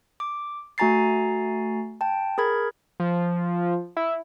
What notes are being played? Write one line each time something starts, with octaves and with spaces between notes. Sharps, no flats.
D6
A3 F#4 G#5 A#5 A6 C7
G5 A5
G#4 A#4 B5 G#6
F3
E4